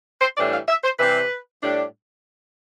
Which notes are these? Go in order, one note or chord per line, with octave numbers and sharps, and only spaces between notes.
C5
A2 E3 G3 D4 D5
F5
E5
C5
C3 E3 G3 C4 B4
A2 G3 D4